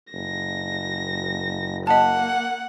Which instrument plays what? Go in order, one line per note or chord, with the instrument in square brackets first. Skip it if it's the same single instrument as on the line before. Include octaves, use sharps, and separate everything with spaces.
[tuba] F#1 [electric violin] A#6
[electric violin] A#3 [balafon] D#5 A5 [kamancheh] F#5